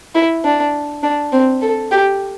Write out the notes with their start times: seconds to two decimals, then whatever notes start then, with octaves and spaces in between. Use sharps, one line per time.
0.15 E4
0.45 D4
1.03 D4
1.32 C4
1.61 A4
1.91 G4